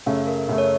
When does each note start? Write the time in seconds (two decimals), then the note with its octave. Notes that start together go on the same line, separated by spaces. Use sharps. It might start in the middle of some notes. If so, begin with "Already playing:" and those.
0.06 F#2 C#3 A3 F5
0.27 A#4
0.48 F#2 C#3 A3
0.58 C#5